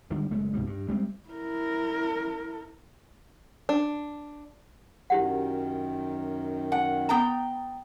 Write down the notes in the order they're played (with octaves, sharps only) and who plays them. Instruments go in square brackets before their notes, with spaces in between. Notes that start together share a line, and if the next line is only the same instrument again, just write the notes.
[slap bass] D3 D#3 G3 G#3
F#1 G#3 A3
C2 G#2 B2 G3
G2
G3 G#3 C4
[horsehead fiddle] E4 A#4
[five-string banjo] D4
[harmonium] F#2 D#3 [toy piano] E4 G4 F#5
[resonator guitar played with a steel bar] F#5 [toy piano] G#5
[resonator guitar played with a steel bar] B3 G5 A#5